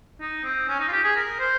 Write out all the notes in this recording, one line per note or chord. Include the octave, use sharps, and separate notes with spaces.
D#4
C4
C#4
D#4
F4
G4
G#4
A#4
C5